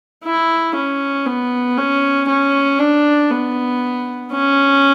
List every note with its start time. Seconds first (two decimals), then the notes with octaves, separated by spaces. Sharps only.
0.24 E4
0.75 C#4
1.26 B3
1.77 C#4
2.28 C#4
2.79 D4
3.30 B3
4.32 C#4